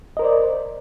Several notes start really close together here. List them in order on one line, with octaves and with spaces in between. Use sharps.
D#5 A#4 C5 D5